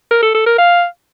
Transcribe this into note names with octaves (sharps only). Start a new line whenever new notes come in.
A#4
A4
A4
A#4
F5